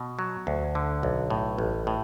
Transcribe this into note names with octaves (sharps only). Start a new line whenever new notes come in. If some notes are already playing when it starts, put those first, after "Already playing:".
Already playing: B2
F#3
D2
D3
B1
A2
A1
A2